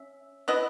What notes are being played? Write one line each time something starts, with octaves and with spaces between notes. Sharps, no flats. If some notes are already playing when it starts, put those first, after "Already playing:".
Already playing: C#4 E5
B3 E4 B4 D#5